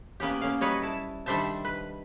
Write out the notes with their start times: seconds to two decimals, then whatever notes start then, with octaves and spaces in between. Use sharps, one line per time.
0.20 A#3 B3 C#4 G4
0.41 A#3 C#4 F5
0.61 F#3 G3 B4 C#5 D#5
0.82 E4 A5
1.26 D#3 G3 D4 C5 E5 A5
1.65 B4